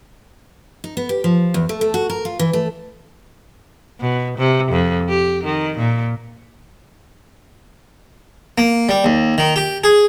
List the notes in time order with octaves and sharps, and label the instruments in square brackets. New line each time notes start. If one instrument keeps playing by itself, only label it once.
[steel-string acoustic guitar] D#4
B3
G4
F3
E2
A3
A3
F#4
A#4
F4
E3
A3
[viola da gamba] B2
C3
F2
G4
D#3
A#2
[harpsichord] A#3
G3
D#2
D#3
G4
G#4